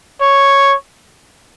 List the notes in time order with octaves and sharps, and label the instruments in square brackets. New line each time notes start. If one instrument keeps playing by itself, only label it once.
[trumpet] C#5